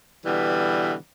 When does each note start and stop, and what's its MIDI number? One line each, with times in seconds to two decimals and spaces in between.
0.25 0.95 47
0.25 0.95 50
0.25 0.95 52
0.25 0.95 55